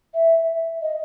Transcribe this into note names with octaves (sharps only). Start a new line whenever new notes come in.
E5
D#5